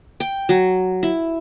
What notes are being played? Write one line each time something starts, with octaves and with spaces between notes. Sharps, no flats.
G5
F#3
E4